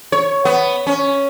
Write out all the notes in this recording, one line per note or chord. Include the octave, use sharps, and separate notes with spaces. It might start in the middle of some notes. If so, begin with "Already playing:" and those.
C#5
B3
C#4